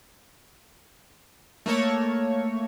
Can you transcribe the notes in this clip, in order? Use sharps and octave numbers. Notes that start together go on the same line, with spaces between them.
A3 A#3 C#5